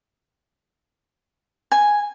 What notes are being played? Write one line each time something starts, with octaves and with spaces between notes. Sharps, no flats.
G#5